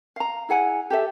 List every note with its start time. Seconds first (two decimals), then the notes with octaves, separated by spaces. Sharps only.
0.16 F5 A#5
0.49 E4 G#4 F#5 G#5
0.90 G4 A4 E5